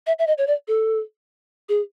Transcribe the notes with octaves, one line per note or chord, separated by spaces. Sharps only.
E5
E5
D#5
C#5
D5
A4
G#4